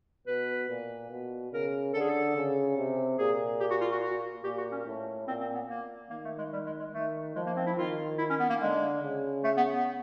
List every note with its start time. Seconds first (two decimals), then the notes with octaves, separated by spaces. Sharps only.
0.27 B2 B4
0.69 A#2
1.10 B2
1.52 C#3 A#4
1.94 D3 A4
2.01 G#4
2.09 A4
2.36 C#3
2.77 C3
3.19 A#2 G#4
3.60 G4
3.70 F#4
3.81 F4
3.92 F#4
4.03 F#4
4.44 A#2 G4
4.58 F#4
4.72 C#4
4.86 A2
5.27 A#2 C4
5.41 C4
5.54 B3
5.69 A#3
6.10 D#3 A#3
6.25 A3
6.38 G#3
6.53 G3
6.66 G#3
6.79 G#3
6.93 D#3 A3
7.35 F3 G#3
7.46 A#3
7.57 C4
7.66 E4
7.77 D#3 F4
8.18 E4
8.30 C#4
8.40 B3
8.50 A#3
8.60 D3 G#3
9.02 C#3
9.44 A3
9.57 B3
9.72 B3